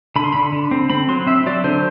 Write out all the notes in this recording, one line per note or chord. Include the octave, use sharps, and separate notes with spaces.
D3 B5
C6
D3 B5
D3
C4
C4 B5
F#3 C6
C4 E5
F#3 D5
D3 C5